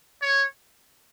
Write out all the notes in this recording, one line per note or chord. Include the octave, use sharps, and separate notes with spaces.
C#5